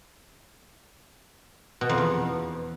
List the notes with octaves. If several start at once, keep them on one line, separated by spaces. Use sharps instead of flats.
B2
F2
E2